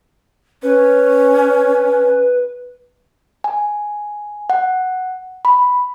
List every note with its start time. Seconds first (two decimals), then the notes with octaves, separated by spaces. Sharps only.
0.63 C#4 B4
3.44 G#5
4.50 F#5
5.45 B5